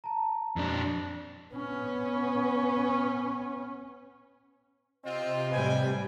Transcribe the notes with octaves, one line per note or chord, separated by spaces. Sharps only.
A5 A#5
F2 D4
B3 C#4
C3 C4 F4 D#5
A2 G3 B4 G5 G#5